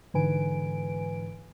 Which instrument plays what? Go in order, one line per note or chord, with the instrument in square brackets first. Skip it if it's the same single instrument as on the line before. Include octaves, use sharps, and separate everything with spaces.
[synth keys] G#2 D3 E3 B4 G#5 D7